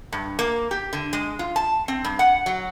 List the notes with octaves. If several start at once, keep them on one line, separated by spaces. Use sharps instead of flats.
G2
A#3
G4
D3
G#3
F4
A5
C4
G2
F#5
F#3